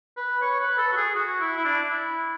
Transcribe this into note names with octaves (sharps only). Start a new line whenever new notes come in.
B4
C#5
B4
A4
F#4
G#4
F#4
E4
E4
D4
E4